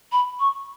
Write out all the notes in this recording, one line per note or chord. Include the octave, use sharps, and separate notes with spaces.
B5
C#6